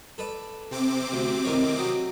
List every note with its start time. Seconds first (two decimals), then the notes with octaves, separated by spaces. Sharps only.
0.18 A4 B4 D5
0.71 C3 C4 D6
1.12 D2
1.45 A2 D#3 C#5
1.78 F#3 D#6